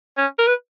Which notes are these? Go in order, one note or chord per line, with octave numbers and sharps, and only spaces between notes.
C#4
A#4
B4